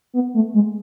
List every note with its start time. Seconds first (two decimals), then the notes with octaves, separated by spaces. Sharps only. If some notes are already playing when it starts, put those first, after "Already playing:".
0.13 B3
0.34 A3
0.54 G#3